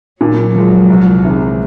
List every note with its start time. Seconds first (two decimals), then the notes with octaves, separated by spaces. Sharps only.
0.21 A#2 F#3
0.55 F3 G#3
0.89 C2
1.24 C3 E3 G#3